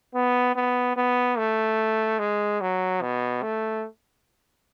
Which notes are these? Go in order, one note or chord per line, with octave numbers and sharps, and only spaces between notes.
B3
B3
B3
A3
G#3
F#3
B2
A3